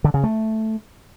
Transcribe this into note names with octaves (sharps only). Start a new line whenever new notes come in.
D3
C#3
A3